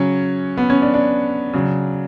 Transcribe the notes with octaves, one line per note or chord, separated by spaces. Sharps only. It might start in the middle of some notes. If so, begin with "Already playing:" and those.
Already playing: C#3 F#3 C#4
B3
C#4
D4
D4
C#3 F#3